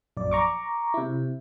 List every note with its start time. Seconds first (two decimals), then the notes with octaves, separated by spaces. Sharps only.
0.17 A#1 F#2 D5
0.31 A#5 C#6 D6
0.94 C3 E4